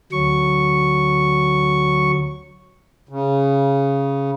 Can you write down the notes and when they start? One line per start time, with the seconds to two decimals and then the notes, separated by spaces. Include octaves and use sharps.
0.12 D2 F#3 C#6
3.09 C#3